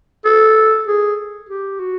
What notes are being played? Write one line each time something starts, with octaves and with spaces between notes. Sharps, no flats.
A4
G#4
G4
F#4